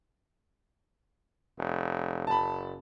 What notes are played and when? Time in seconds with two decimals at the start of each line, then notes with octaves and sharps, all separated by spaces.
1.58 F1
2.27 F#1 A5 B5